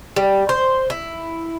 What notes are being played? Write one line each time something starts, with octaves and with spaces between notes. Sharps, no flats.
G3
C5
E4